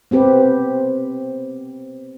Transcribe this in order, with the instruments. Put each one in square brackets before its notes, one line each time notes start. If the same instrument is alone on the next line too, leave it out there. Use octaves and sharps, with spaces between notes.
[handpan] B3 C4 G4 B4